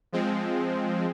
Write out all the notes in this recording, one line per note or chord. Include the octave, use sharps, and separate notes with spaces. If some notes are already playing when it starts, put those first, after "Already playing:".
F3 G#3 C4